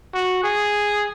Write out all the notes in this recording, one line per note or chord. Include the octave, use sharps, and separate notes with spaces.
F#4
G#4